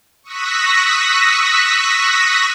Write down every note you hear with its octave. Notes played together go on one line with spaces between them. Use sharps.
C#6 D#6 E6 F#6 A#6 B6